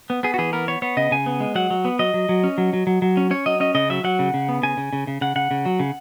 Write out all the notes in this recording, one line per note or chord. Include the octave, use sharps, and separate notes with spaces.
B3
B3 G#4
F#4
E3 G#4
B3 A#4
B3 C#5
B3 C#5
C#3 D#5
C#3 G#5
B3
G#3
F#3 F#5
F#3
B3
F#3 D#5
F#3
F#3
C#4
F#3
F#3
F#3
F#3
C#4
C#4 C#5
F#3 D#5
C#4 D#5
C#3 D#5
F#3 E5
F#3 F#5
C#3
C#3
B3
C#3 G#5
C#3
C#3
C#3
C#3 F#5
C#3 F#5
C#3
F#3
C#3